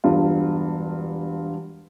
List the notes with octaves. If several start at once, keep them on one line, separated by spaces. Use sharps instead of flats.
E1 G2 F4